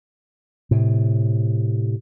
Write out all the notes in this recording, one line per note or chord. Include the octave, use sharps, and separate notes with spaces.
A2 C3